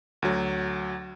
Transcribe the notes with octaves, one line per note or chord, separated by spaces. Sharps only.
D2 F#3